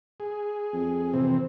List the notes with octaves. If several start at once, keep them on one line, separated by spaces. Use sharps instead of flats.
G#4
F2
C3 E3 C4